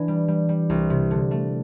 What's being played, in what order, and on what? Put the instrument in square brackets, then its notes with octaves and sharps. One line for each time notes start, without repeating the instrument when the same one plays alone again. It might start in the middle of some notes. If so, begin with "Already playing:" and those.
Already playing: [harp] E3 D4 D5
G3
G3
G3
C2
C3
D3
A3